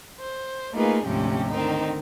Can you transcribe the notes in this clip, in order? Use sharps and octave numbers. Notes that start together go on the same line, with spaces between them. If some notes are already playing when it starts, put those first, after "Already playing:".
C5
A3 A#3 D#4 F4 G#4 B4
D2 G#2 C3 F3 C#4 G4
D3 D#3 C4 D#4